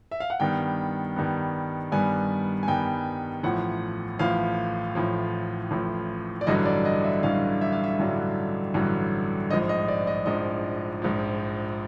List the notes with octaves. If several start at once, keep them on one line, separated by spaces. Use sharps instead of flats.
E5
F5
F#5
G2 D#3 G3 B3 G5
G2 D#3 G3 B3
G2 D#3 G3 B3 G#5
G#5
G2 D#3 G3 B3 G5
A1 A2 F3 F#5
A1 A2 F3 F5
A1 A2 F3
A1 A2 F3
D5
A1 G2 D3 F#3 D#5
D5
D#5
E5
A1 G2 D3 F#3 F5
E5
F5
E5
A1 G2 D3 F#3
A1 G2 D3 F#3
A#1 G#2 F3 D#5
D#5
D5
D#5
A#1 G#2 F3 D#5
A#1 G#2 F3